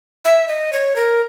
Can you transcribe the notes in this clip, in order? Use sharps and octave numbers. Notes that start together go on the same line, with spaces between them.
E5
D#5
C#5
A#4